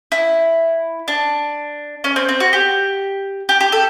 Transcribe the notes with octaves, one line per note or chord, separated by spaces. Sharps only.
E4
D4
C#4
C4
C4
F#4
G4
G4
G4
A4